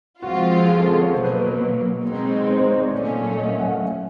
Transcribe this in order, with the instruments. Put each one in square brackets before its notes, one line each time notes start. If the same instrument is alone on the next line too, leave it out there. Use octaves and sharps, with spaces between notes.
[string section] F3 G#3 C4 F4 [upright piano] F#4
[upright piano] G#4
A4
G#4
C#5
[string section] B2 F#3 A#3 [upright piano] C5
[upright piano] B4
B4
B4
[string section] B2 G#3 C4 D#4
[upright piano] C5
C5
C#5
D5
[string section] A#2 F#3 A3 C#4 [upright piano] D5
[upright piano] D#5
E5
F#5
F5